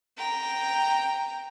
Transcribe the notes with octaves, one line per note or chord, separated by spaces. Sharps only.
G5 A#5